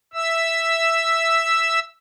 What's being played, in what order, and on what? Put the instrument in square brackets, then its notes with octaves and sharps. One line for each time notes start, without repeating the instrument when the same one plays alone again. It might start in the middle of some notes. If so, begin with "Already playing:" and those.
[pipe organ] E5 E6